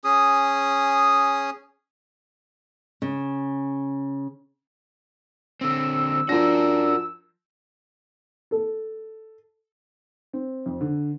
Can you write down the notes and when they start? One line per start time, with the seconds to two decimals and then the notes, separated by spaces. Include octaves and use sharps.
0.04 C#4 G#4 D#6
3.02 C#3
5.61 D3 C4 E6
6.29 F3 D4 F#4 A#4 A#6
8.51 A4
10.33 C4
10.66 F2
10.81 D3